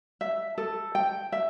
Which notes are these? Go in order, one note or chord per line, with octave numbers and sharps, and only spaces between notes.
E5
A4
G5
E5